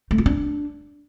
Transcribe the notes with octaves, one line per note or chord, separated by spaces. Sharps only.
A3
F4
D4